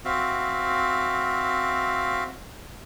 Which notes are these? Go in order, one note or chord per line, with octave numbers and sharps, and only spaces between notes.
C4 F#4 E5 F5